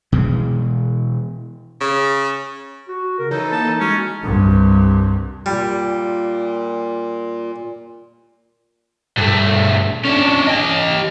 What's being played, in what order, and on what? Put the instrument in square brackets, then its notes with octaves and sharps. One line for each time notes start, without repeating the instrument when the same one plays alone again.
[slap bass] B2 E3 G#3
[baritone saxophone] C#3
[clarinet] F#4
[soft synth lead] C#3 [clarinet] A#4
[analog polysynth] E3 A4 D#5 [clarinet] D#4 [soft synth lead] C#5
[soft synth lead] A#3 [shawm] A5
[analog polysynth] G#3 [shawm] C#4 [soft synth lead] F#4
[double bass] C2 G2
[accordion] A#2 [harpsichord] G3
[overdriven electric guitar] G2 A3
C#4 D4
G4 D#5